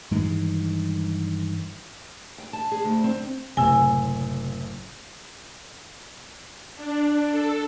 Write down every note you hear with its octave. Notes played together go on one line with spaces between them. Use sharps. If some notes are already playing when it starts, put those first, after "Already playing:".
G2 D#3 E3 G#3
G5
A5
G#4
D2
C4
F#1 A2 C3 G#5 E6
D4
A4